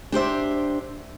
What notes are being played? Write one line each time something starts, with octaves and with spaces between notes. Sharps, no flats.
D4 G4 C5 E5